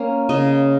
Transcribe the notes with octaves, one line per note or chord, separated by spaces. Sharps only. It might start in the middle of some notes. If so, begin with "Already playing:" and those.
Already playing: A#3 C#4
C#3 D#5